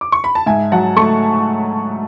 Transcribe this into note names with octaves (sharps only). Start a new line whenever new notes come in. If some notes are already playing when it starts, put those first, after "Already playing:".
D6
C#6
B5
A5
G#2 E5 G#5
F#3 F#5 A5
A3 A5 C#6